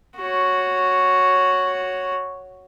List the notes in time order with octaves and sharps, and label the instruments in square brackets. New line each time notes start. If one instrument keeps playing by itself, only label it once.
[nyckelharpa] F#4 C#5